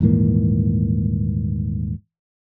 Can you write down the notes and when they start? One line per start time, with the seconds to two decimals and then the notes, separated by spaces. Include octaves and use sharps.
0.01 D#1 G#2 E3 A#3